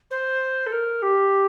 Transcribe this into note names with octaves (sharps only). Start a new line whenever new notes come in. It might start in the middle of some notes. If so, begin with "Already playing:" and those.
C5
A4
A#4
G4